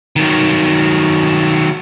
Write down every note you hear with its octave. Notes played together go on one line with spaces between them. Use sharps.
D#3 F#3